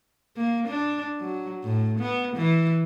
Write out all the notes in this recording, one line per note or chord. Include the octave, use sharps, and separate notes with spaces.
A#3
D4
F#3
A2
B3
E3